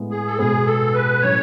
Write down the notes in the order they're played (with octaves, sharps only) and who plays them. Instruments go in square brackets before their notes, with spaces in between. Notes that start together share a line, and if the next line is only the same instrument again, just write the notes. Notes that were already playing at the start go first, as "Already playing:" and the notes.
Already playing: [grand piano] A2 G#3 B3 E4
[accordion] G#4
A4
[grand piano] B2 G#3 B3 [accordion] G#4
[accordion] A4
B4
[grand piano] A2 F#3 C#4 [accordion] C#5